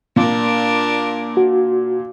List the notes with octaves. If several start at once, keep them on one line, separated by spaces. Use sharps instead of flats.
A#2 D4 A#4
F#4